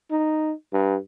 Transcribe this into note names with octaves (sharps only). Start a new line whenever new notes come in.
D#4
G2